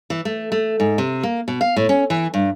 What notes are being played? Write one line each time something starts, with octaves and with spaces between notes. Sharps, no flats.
E3
A3
A3
G#2
C3
A#3
B2
F5
A2
C#4
E3
G2